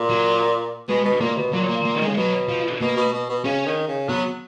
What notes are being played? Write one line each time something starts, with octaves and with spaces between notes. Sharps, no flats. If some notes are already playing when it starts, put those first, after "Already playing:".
Already playing: A#2
F#3
B2 G#3
B2
A#2 A#3
B2
A#2 F#3
A#3
A#3
D#3 G#3
C#3
B2 F#3
F3
B2 A#3
B2
B2
B2
C#3 C#4
D#3
C#3
F#3 B3